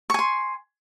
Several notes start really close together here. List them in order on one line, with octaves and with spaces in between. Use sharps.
C#6 G#5 C6